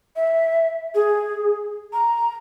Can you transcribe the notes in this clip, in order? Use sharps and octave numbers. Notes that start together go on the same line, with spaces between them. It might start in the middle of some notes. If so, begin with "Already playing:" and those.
E5
G#4
A#5